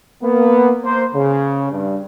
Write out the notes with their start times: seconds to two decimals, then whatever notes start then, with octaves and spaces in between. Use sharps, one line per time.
0.22 A#3 B3
0.85 A#3 C5
1.14 C#3
1.71 G2